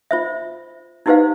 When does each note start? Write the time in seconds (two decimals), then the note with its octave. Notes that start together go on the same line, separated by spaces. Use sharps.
0.11 F4 C5 E5
1.06 D#4 E4 G4 B4 C5 F5